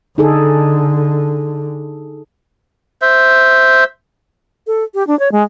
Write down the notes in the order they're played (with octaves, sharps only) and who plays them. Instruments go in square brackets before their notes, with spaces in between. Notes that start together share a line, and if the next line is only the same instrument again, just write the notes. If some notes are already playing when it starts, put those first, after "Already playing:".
[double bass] D3 [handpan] D#4 G#4 A4
[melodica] C5 E5
[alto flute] A4
G4
D4
C#5
G#3